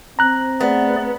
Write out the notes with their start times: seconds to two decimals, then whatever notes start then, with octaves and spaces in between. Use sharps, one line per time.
0.19 C4 A#5 F#6
0.61 A3 B3 G#4 D5